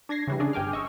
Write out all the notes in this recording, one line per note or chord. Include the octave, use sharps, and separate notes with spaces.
D4 G#6 A#6 C7
C#3 E3 G3
C#4 D4 G#4
G1 G5 G#5 D6 F6
D#5 C#6 E6